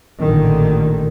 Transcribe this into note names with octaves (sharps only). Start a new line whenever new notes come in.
A1 A#2 D3 D#3